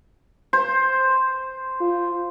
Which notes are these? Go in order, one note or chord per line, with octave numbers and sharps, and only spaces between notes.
C5
F4